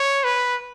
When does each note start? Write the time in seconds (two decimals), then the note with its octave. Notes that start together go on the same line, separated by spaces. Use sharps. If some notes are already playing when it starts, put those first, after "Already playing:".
Already playing: C#5
0.24 B4